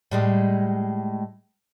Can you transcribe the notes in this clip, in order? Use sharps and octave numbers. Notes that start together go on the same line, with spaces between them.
A2 G3 G#3